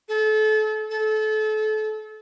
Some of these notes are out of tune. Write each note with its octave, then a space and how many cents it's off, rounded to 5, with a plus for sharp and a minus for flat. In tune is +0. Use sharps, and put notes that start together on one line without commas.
A4 -35
A4 -30